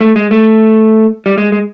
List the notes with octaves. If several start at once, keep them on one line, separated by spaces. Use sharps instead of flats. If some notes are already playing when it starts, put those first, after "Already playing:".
A3
G#3
A3
G3
G#3
G#3